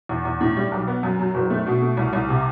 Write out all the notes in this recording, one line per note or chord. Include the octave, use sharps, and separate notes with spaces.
E2
E2
A2
G3
B1
B3
F#2
F#3
F#1
A3
B2
A3
C2
C2
C3